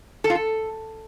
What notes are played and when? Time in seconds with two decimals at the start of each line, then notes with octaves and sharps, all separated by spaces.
0.24 A4
0.30 F4
0.35 A4